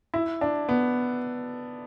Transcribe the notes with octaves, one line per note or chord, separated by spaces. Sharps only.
E4
D4
B3